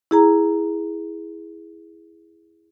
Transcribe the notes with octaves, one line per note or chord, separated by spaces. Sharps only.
E4 G#4 A#5